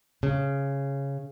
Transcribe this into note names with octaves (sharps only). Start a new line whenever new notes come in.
C#3